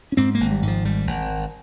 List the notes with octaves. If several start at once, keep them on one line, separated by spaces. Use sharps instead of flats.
C#4
G#2 C4
A#3
G#1
G3
G#2
F3
G#1 G3
G#1